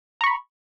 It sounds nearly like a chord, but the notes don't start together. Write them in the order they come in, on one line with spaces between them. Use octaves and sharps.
A#5 C#6 B5